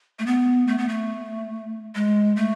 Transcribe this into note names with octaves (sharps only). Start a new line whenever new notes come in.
A3
B3
A3
B3
A3
G#3
A3